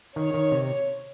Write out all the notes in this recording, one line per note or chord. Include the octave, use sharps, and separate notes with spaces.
D#3 C#5
D#3
C3